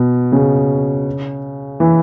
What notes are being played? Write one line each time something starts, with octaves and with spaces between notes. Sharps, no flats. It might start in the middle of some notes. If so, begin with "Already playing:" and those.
Already playing: B2
C#3
E3